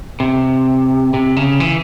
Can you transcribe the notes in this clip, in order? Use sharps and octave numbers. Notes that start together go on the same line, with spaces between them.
C3
C3
C#3
E3